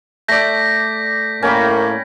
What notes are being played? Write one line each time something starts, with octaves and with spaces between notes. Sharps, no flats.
A3 D5 G6 A#6 B6
A2 A#3 C#4 G5 B5